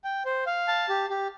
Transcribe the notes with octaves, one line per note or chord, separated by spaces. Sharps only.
G5
C5
F5
A5
G4
G4